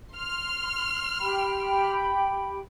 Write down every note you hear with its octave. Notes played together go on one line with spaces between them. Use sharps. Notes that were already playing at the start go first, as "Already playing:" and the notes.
C6 F6
G4 G5 B5